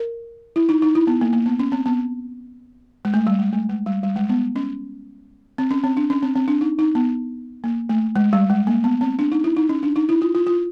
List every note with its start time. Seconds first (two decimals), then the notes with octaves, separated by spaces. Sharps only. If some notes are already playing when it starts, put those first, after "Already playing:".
Already playing: A#4
0.56 E4
0.69 D#4
0.82 D#4
0.95 E4
1.07 B3
1.21 A#3
1.33 A#3
1.46 B3
1.59 C#4
1.72 C4
1.86 B3
3.05 G#3
3.14 A3
3.27 G3
3.39 G#3
3.53 A3
3.69 G#3
3.86 G3
4.03 G3
4.16 G#3
4.29 B3
4.56 C#4
5.58 C4
5.71 C#4
5.84 C4
5.97 D4
6.10 C#4
6.23 C4
6.36 C4
6.48 D4
6.61 D#4
6.79 D#4
6.95 B3
7.64 A#3
7.89 A3
8.16 G#3
8.33 G3
8.50 G#3
8.67 A#3
8.84 B3
9.01 C4
9.19 D4
9.32 D#4
9.44 E4
9.57 D#4
9.69 C#4
9.83 D4
9.96 D#4
10.09 E4
10.22 F4
10.35 F4
10.47 F4